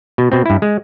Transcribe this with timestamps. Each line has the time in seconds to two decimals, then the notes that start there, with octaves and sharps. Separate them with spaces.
0.18 B2
0.32 B2 C4
0.46 G2 E4
0.62 G#3